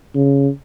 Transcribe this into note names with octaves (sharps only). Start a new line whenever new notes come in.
C#3